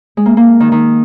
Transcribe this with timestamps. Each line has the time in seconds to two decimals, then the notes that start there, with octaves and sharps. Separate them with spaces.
0.17 G#3
0.26 A#3
0.37 A#3
0.60 D#3
0.72 D#3